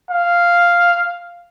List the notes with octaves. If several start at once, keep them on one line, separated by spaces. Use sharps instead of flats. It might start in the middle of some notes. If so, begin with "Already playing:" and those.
F5